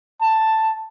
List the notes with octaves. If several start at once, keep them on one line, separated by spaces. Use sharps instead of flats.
A5